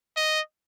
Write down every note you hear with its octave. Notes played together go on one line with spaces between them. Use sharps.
D#5